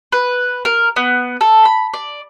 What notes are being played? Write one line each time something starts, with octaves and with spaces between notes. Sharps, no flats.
B4
A#4
B3
A4
B5
D5